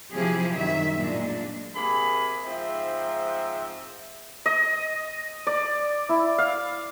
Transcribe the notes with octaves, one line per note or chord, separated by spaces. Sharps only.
C3 F3 F#3 E4 G4 G#4
F#2 D#3 G3 E5
A#2 G#3 D4
C3 A#3 G#4 B5
G#2 F3 C4 E5
D#5
D5
E4
F5